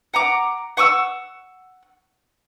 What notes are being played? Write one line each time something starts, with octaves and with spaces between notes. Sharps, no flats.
F#5 A#5 D6
F#5 C#6 D6 E6